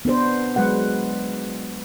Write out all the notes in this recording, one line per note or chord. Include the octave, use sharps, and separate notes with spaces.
B3 D4 B4 C5
F#3 G#3 B4 F#5